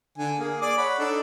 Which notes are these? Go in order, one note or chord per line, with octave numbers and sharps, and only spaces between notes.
D3 G#5
A#3 G#4
G#4 D5 D6
C#5 F#5 B5
D4 D#4 A4